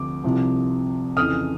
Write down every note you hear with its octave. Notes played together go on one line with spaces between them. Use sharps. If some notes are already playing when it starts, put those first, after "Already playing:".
Already playing: D2 C3 F3 D6
C2 C3 F3
F2 C#3 E3 D#6 F6